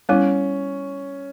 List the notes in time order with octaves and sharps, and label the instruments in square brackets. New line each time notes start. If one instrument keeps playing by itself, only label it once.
[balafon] G3 B3 E4 [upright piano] C#4